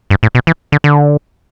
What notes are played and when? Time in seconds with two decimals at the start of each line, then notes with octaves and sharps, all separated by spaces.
0.10 G2
0.23 A2
0.35 B2
0.47 E3
0.72 D3
0.84 D3